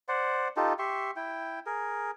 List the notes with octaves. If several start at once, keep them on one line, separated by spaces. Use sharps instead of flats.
C5 D5 F#5
D#4 F4 G4 A4
G4 E5 C6 C#6
E4 G5
G#4 A#4